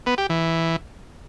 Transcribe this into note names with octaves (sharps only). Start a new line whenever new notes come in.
B3
G4
E3